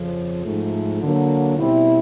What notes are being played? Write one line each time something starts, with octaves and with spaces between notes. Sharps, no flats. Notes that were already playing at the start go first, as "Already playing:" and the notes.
Already playing: F2 C#3 F3
G#2 F3 A3
D3 F#3 A#3
B2 G3 C4 E4